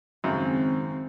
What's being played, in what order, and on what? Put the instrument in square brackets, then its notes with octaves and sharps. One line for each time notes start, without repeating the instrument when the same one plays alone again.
[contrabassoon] G#1 [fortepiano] F#2 C#3 [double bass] C4